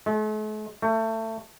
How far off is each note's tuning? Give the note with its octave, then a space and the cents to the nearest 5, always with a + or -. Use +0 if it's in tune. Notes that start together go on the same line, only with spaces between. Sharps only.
A3 -45
A3 +25